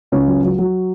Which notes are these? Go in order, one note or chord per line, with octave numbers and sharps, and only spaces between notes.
C#2 C#4
F#3
F#3
F#3